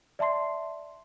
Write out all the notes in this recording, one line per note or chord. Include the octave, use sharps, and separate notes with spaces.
D5 E5 A5 C6 C7